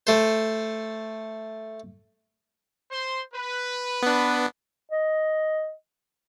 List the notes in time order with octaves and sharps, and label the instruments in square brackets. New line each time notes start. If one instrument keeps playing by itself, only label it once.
[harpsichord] A3 C5
[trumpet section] C5 C6
B4
[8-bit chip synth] B3 D4
[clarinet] D#5